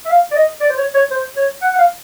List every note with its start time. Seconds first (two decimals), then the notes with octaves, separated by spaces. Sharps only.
0.06 E5
0.10 F5
0.31 D5
0.36 D#5
0.61 D5
0.70 C5
0.77 C#5
0.94 C#5
1.11 C5
1.37 C#5
1.62 F#5
1.74 F#5
1.79 F5